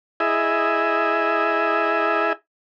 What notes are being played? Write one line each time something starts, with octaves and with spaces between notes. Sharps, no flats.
E4 G#4 D#5 E5